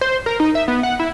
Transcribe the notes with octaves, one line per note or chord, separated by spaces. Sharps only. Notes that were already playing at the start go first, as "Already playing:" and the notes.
C5
A#4
D#4
E5
B3
F#5
E4